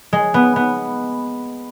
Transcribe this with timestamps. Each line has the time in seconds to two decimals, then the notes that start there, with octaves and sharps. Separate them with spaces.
0.13 G#3
0.34 B3
0.56 B3